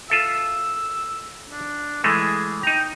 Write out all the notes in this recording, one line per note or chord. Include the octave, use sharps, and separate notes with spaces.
F4 A4 E5 E6
D4
E3 G#3 A3 G#4
D#4 G5 A#5